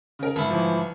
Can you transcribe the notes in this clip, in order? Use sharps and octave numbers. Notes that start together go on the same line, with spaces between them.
C#3 A#4
G1 G#2 E4
E3 F3